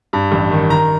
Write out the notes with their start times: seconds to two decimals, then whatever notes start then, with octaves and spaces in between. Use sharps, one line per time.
0.13 G2
0.32 A1
0.51 D#3
0.70 D#3 A#5